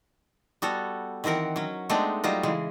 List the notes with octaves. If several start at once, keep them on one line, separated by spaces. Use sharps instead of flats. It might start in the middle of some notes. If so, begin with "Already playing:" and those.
G3 B3 F#4 A4
D#3 E3 C4 A#4 F#5
F#3 C#4
G#3 A3 B3 C4 D4 D#4
F#3 G3 C4 D#4 F4
C#3 E3 G#3